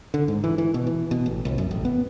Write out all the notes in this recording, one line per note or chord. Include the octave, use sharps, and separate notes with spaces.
D3
G#2
E3
E3
B2
E3
B2
A1
C2
F#2
A1
B3